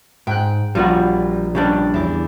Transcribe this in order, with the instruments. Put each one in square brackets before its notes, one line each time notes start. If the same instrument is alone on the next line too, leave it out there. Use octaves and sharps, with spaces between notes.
[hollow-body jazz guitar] G#2 [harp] G5 F#6
[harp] A#1 [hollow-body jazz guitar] G3 F4 F#4
[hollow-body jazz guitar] C#3 G3 D4
[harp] E2 D6